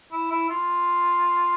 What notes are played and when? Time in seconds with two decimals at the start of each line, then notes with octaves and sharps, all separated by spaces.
0.12 E4
0.31 E4
0.50 F4